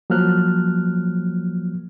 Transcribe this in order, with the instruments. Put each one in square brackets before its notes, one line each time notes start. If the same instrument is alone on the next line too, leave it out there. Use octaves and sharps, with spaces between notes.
[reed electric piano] F3 F#3 A#3 F6 F#6